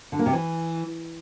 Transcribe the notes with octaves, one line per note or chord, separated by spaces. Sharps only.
D3
A#3
C3
E3